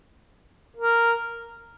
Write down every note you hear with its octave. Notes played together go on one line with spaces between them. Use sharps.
A#4